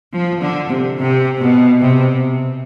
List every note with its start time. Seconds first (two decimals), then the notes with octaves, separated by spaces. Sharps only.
0.13 F3
0.41 D3
0.69 C3
0.97 C3
1.39 B2
1.82 C3